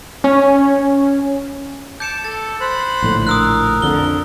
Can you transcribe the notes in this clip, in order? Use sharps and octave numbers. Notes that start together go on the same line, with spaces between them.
C#4
A5 D6 G6 C#7 E7
A4 A6
C5 B5 F#6
A#1 A2 D3
A#4 D#6 E6 F#6
F2 D3 G7